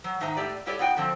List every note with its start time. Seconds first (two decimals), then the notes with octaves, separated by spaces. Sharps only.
0.04 F#3
0.20 G#2 D#3 D#4 E5 A#5
0.37 A2 G4 D5
0.66 G3 E4 G4 A4 C#5 D5
0.79 B3 D#4 F#4 G5
0.97 D3 F3 C4